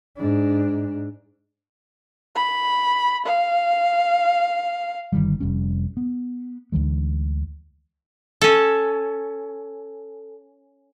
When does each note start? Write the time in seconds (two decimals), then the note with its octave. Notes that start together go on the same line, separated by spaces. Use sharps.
0.17 G#2 D4
2.36 B5
3.26 F5
5.13 G1 D#3 G3
5.40 F1 G3 C#4
5.97 B3
6.72 D2 D3 E3 G#3
8.41 C#4 A4